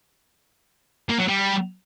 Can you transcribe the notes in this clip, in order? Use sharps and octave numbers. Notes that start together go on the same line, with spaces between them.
A#3
F#3
G3